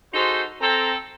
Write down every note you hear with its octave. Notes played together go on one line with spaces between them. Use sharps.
D#4 F#4 G#4 A4 C5
C4 A4 A#5